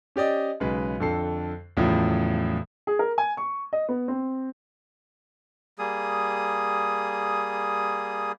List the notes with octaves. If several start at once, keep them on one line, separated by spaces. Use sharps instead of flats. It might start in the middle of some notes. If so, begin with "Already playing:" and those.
C#4 G4 D5 D#5
B1 C#3 G#3 B4
F2 D3 A4 C7
E2 A2 C#3 F3 F#3
G#4
A#4
G#5
C#6
D#5
B3
C4
G3 A#3 G#4 D#6